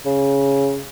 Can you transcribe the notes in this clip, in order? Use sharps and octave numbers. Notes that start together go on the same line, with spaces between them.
C#3